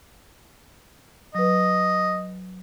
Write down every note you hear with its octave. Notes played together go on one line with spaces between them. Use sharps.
F#3 B4 D#5